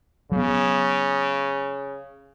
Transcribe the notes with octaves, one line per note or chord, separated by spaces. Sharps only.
C#3 F#3 B3